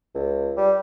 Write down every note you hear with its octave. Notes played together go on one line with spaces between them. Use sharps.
C#2
G3